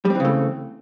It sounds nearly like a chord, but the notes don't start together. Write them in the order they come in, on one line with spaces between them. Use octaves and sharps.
G3 C4 E3 C#3 A3